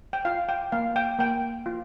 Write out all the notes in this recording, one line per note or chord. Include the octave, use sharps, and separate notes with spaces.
G5
F4 F5
G5
A#3 F5
G5
A#3 G5
F4